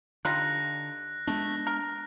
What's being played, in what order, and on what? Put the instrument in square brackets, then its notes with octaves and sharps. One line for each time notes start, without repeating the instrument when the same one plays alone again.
[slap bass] D3 [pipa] G3 D#4 F4 [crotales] F#6 A#6
[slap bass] G#3 B3 D4 [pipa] A3
[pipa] A#4